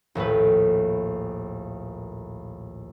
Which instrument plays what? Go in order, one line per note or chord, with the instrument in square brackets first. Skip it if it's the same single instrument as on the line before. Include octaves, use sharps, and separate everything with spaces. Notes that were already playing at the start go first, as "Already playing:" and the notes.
[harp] A#1 D#2 A2 B4